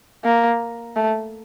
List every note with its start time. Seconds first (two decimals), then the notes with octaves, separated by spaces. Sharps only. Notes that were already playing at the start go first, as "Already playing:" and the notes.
0.24 A#3
0.96 A3